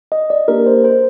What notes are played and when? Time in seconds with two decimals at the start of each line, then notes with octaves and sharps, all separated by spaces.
0.12 D#5
0.30 D5
0.48 A#3 D4 G4 A#4
0.66 C5
0.84 C5